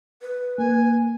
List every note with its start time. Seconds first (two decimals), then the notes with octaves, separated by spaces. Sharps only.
0.22 B4
0.58 A#3 G#5